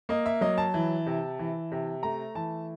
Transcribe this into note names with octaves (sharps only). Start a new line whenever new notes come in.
A#3 D#5
E5
F#3 D#5
A5
E3
C3
E3
C3
A3 A#5
E3 A5